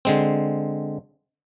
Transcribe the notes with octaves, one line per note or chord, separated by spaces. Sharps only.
D3 G#3 C4